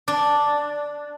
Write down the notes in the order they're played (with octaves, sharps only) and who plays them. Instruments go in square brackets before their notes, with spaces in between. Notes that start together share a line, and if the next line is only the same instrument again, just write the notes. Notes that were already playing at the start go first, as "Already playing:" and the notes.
[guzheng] D4